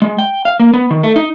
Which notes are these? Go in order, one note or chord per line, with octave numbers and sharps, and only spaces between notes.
G#3
G5
F5
A#3
B3
D#3
A3
D#4